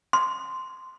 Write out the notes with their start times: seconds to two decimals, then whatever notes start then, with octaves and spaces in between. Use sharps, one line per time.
0.13 C6